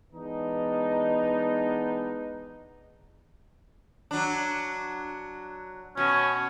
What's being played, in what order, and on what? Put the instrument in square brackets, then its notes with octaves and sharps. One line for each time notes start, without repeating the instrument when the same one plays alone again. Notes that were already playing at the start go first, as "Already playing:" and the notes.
[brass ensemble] E3 G#3 B3 D4 D#4
[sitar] F#3 D4
[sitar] B2 [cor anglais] C#4